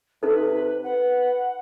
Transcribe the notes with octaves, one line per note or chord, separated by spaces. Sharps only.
C3 D#4 A4 B4
B4 F#5